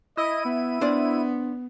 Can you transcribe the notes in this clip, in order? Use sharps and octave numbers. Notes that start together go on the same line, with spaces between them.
E4 D#5 D#7
B3
B3 D4 C5 D5